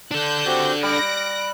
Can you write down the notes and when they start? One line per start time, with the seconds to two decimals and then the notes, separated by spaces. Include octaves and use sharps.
0.11 D4 A4 F#6 G6
0.46 C4 F#4 G4
0.83 G3 F#6 A#6 D7